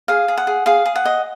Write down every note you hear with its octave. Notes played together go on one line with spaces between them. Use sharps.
G#4 F5
G#4
F#5
G#4
G#4 F5
G#4
F#5
D#5